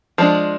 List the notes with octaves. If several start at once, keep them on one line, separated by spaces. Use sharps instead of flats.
F3 G#3 D4